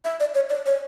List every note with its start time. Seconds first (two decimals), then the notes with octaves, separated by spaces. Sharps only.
0.05 E5
0.20 D5
0.35 C#5
0.50 D5
0.66 C#5